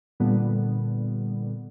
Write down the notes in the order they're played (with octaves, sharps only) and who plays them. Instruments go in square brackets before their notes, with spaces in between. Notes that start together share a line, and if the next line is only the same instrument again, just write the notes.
[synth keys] A#2 D3 G3 B3